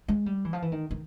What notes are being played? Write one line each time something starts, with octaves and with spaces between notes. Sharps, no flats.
G#3
G3
E3
F3
E3
D#3
D#3